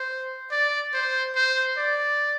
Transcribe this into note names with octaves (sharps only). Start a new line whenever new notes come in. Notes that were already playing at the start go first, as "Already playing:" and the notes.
Already playing: C5
D5
C5
C5
D5